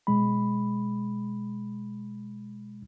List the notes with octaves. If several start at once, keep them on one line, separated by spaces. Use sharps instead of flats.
B2 G#3 B5